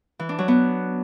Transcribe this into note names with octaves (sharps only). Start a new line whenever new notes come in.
E3
D4
F#3
B3